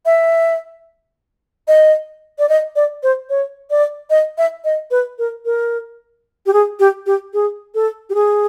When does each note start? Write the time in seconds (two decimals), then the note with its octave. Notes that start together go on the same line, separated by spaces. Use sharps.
0.06 E5
1.68 D#5
2.39 D5
2.49 D#5
2.76 D5
3.03 C5
3.30 C#5
3.70 D5
4.10 D#5
4.38 E5
4.65 D#5
4.91 B4
5.19 A#4
5.45 A#4
6.46 G4
6.53 G#4
6.80 G4
7.06 G4
7.34 G#4
7.75 A4
8.10 G4
8.15 G#4